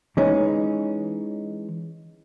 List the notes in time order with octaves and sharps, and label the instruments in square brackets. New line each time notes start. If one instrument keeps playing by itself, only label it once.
[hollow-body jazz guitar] E3 G#3 C#4 D#4